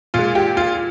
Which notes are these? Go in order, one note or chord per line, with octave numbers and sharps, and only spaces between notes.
A#2 G#3 F4
G4
F4